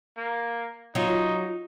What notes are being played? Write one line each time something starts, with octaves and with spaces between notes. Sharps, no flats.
A#3
F#3 D#4 F4